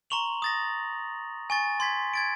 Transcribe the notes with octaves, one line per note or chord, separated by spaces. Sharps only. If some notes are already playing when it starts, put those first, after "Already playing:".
A#5 C6 C#6 F7 F#7
D#6 A6 A#6
G#5 C#6 A6
C6 G#6 B6
G#6 A6 D7